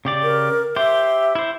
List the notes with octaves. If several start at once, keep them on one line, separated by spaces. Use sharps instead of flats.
C#3 G4 D5
A#4
G4 C5 E5
E4 C5